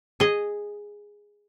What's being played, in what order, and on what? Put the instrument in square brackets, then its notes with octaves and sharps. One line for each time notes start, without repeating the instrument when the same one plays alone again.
[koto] G#4 D#5